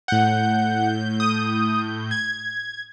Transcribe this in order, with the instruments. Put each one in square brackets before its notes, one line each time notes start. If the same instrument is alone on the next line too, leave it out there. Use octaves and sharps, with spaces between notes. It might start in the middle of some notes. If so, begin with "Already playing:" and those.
[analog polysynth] A2 G6 [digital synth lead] F#5
[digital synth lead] D#6
G#6